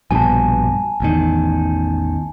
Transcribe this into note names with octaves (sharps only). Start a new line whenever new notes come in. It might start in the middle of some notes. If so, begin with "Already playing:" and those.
A#1 G2 B2 G#5 A5
A1 E2 D#3